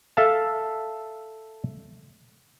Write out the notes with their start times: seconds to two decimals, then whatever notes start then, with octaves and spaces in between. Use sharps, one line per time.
0.17 A4 E5 F5 A5